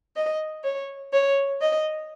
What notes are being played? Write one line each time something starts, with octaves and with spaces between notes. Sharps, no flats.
D#5
C#5
C#5
D#5